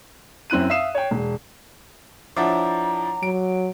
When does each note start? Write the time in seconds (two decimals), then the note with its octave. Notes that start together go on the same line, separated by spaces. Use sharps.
0.50 F#2 C4 E4 F#6 D#7
0.70 E5 F5 D#6 C7 E7
0.95 C#5 G5
1.11 E1
2.36 F3 D4 E4 C#5 F#5 A#5 D6
3.23 F#3 D7